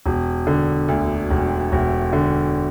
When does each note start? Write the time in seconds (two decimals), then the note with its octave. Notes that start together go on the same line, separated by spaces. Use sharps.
0.06 E1
0.47 D3
0.88 D2
1.30 E1
1.72 E1
2.13 D3